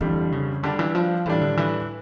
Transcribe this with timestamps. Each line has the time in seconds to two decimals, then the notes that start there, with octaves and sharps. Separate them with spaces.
0.01 F2 D3 E3 G3
0.32 C#3
0.63 D3 G3 D4 G4
0.79 E3
0.95 F3
1.26 A2 E3 G3 D4
1.41 D3
1.57 E3